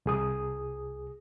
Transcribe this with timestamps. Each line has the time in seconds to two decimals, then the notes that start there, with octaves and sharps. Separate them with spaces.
0.06 C2 G#4 D#6